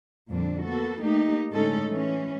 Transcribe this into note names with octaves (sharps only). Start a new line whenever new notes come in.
F2 A#2 D3 G3 D4
A#3 B3 F#4 A4
A3 A#3 D#4 G4
A2 D3 G#3 C#4 D#4 A4
E3 G#3 C#4